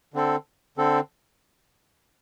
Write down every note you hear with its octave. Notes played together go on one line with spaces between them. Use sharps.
D3 C4 A4
D3 C4 A4